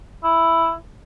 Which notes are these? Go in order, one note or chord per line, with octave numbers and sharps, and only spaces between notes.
E4